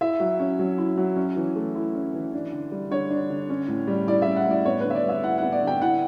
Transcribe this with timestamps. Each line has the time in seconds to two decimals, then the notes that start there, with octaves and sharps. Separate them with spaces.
0.01 E4 E5
0.20 F#3
0.40 C#4
0.59 F#3
0.78 E4
0.98 F#3
1.16 C#4
1.36 E3
1.56 A3
1.75 E4
1.95 C#4
2.14 E3
2.33 D4
2.52 D3
2.72 G3
2.91 D3 C#5
3.11 D4
3.30 D3
3.50 C#4
3.68 A2
3.87 G3
4.07 E4 D5
4.22 C#4 E5
4.36 F#5
4.46 A2
4.51 D5
4.65 B3 C#5
4.80 D3 B4
4.90 E5
4.95 D5
5.04 G3
5.09 E5
5.23 E4 F#5
5.38 B3 F#5
5.52 D5
5.62 D3
5.67 G5
5.82 E4 F#5